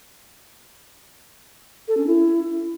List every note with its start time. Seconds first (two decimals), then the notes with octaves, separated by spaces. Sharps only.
1.88 A4
1.97 C#4
2.07 E4